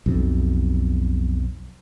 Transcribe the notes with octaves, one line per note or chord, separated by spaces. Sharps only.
B1 F2